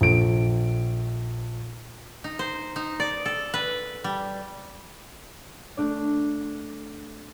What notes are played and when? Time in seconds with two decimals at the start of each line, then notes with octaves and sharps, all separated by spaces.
0.01 A#1 A4 D7
2.24 D#4
2.39 C5
2.76 D#4
3.00 D5
3.26 A4
3.54 B4
4.04 G3
5.77 A3 D4 D5